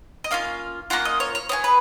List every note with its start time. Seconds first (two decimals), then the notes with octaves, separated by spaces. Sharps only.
0.24 D#5
0.31 A#3 C#4 F4 F5
0.90 A#3 C#4 F4 F#5
1.05 D#5
1.20 C#5
1.35 C#5
1.49 B3 F4 G#4 C#5
1.64 B4